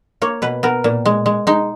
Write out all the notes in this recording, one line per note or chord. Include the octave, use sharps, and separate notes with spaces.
A#3 C#5
B2 B4
B3 A#4
A#2
G#3
G#3
G#3 D#4